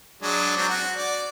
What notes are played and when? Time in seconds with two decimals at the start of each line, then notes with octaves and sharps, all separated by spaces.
0.22 F#3 G#3 D4
0.57 F#3 C4 D4
0.69 F#4
0.97 D5